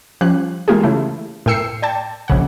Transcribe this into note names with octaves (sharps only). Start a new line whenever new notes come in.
F3 G3 C#4 F#6
E3 G#3 A#3 F4 G4 G#4
C#3 E3 A3 E4
A2 A#4 G5 E6 C7 C#7
D5 G5 A5
A#1 C#3 F#5